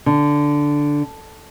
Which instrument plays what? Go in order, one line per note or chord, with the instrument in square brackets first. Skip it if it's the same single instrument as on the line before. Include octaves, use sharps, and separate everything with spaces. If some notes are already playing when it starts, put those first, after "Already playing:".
[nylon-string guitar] D3